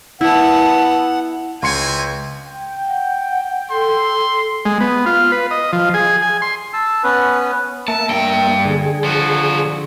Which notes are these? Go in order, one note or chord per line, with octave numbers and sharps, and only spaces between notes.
B3 E4 F#5 A5
C#2 A3 C4 G#5 C6 C#7
G5
F#5
A4 C6
G#3
B3
F4
B4
D#5
F3
G#4
G#5
C6
A5 E6
B3 C#4 B4
A#3 E5 A5
G2 G5
D3 G#4
F3 F#4